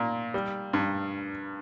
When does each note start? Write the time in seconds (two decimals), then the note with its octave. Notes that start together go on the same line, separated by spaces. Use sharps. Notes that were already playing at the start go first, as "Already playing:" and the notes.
Already playing: A#2 A#3
0.34 G3
0.73 G2